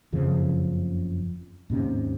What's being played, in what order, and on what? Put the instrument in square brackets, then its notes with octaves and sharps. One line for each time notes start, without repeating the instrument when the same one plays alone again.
[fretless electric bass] F#1 F2 C#3 F3
D#2 G#2 C3 C#4